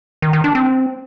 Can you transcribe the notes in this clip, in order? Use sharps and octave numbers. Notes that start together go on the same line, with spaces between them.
D#3
D#3
D4
C4